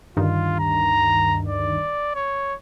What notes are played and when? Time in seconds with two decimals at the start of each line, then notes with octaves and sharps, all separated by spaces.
0.17 D2 G2 D#3 F4
0.59 A#5
1.48 D5
2.15 C#5